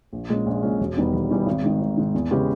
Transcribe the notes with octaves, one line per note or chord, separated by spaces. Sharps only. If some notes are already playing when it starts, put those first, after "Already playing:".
A#1
A#2 G#3 C#4
A#1
A#2 G#3 C#4
E1
E2 D#3 G3 B3
E1
E2 D#3 G3 B3
G#1
G#2 D#3
G#1
G#2 D#3
E2
C#3 G#3 B3 G4